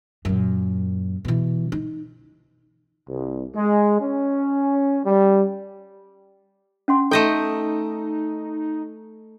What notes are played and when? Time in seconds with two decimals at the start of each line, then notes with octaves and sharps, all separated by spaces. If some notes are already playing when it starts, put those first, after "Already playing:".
0.25 F#2 A#2
1.25 B2 E3
1.72 D#4
3.08 C2
3.55 G#3
4.01 C#4
5.05 G3
6.88 C#4 F#5 C6
7.11 A3 D#4 A4 D#5 G5